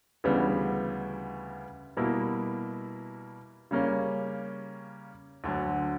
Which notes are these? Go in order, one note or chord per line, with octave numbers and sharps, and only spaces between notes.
D2 C#3 E3 G3 B3
B2 G3 A#3 E4
C#3 G3 A#3 C#4
D2 D3 F#3